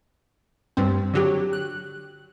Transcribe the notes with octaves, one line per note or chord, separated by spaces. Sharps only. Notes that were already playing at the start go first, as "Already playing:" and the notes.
G2 C4
D3 F#3 G4
F#6